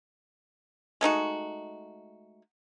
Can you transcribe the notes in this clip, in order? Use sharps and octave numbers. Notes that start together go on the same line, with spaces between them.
G#3 A3 D#4 F#4